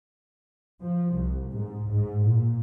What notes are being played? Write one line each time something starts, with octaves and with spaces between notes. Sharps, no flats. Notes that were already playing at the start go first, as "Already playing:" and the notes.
F3
C2
G#2
G#2
A#2